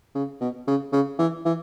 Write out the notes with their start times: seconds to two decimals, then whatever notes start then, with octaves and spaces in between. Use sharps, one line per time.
0.15 C#3
0.41 B2
0.68 C#3
0.93 C#3
1.19 E3
1.45 E3